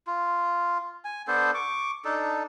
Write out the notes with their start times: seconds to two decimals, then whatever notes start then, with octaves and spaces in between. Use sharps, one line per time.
0.07 F4
1.05 G#5
1.28 B3 D4 A4 C5
1.54 C#6 D6
2.05 D4 D#4 A4